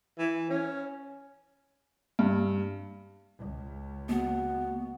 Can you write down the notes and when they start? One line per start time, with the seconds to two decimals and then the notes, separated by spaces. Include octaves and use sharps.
0.18 E3
0.50 C#4
2.19 G2
3.39 C#2
4.09 A#3 B3 F#4